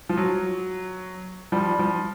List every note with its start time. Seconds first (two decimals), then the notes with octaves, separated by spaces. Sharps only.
0.09 F3
0.17 F#3
1.52 F3 G3
1.79 F3